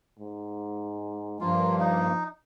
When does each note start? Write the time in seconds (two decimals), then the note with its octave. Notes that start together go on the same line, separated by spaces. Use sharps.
0.19 G#2
1.41 G2 F3 A#3 F4
1.80 D#4